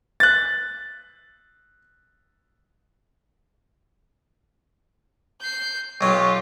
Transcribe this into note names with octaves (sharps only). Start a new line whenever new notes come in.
F#6 A6
G6 C7
B1 F#3 F4 G4